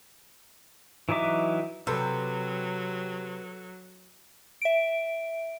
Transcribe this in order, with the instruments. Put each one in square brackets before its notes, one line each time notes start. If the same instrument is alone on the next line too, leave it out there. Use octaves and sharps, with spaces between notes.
[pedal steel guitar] E3 F#3 D#4 E5 D6
[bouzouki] C3 [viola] F#3 [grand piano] A4 E6 [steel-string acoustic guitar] B4
[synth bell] E5 D7